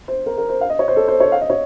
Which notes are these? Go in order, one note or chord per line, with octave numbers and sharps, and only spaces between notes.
C5
A#4
A#4
C5
F5
D#5
C#5
C5
A4
C5
C#5
F5
D#5
C#5